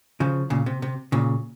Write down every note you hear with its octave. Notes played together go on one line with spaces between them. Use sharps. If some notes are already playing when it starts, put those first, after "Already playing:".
C#3 F3
A#2 C#3
C3
C3
A#2 C#3